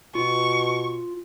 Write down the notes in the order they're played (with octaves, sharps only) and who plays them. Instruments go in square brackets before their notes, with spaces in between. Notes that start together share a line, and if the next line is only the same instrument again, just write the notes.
[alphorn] B2 [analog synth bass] F4 [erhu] C#6